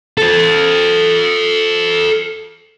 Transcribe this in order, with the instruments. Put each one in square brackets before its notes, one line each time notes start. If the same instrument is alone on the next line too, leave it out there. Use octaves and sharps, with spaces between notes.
[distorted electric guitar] A4 C5